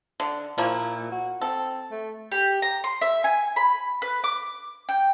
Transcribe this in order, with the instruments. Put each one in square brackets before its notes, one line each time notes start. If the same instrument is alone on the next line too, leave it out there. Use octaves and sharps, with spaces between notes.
[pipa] D3
[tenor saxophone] A#2 [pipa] F3 A#3 E4
[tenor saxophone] F#4
[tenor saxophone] C4 [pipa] A4
[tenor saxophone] A3
[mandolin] G4
A#5
C6
E5
G#5
B5
B4
D6
G5